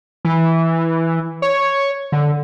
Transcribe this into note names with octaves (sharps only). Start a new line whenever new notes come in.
E3
C#5
D3